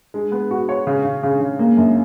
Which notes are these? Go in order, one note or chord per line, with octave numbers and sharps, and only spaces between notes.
G#3
B3
F#4
C#5
C#3
C#3
C#3
C#3
A#3
F#2